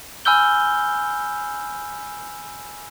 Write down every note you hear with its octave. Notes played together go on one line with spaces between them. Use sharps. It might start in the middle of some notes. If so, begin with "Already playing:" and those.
G#5 B5 E6 F6 G6 G7